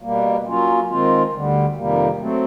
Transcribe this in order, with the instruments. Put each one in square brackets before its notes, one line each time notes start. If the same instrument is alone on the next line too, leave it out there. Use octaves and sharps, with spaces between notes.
[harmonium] B2 G3 A#3
F#3 A#3 C#4 F4
D#3 G#3 C4 F4
D2 D3 G3
F2 C3 D#3 G3 A#3
F#3 A3 C4